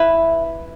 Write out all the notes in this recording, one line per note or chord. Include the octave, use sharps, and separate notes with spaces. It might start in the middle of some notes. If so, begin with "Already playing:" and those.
Already playing: E4 B4 E5